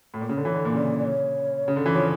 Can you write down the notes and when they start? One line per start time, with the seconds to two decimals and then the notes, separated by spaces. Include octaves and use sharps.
0.14 A2
0.21 A#2
0.29 C#3
0.37 D3
0.44 E3 C#5
0.54 D3
0.65 A#2
0.74 C#3 D5
0.99 D5
1.05 C#5
1.68 C#3
1.76 D3
1.86 E3
1.94 F3 C#5